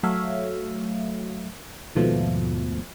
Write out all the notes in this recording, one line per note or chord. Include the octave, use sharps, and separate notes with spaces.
F#3 A3 C#5 E5 F5
D#2 G#2 B2 F3 A3